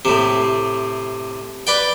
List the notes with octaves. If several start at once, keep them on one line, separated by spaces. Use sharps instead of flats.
A2 C3
B4 D5 G5